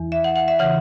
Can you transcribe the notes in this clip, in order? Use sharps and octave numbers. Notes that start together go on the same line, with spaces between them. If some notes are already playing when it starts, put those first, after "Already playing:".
Already playing: E2 E3
E5
F#5
F#5
E5
C#3 E3 F#5